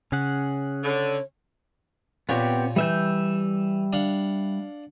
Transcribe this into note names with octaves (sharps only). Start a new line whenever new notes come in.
C#3 C#4 G#4 F#5
D3 C#5
A#2 B3 C4 G4 C#5 C#6
E3 G3 E5 G6
D4 F5 F#5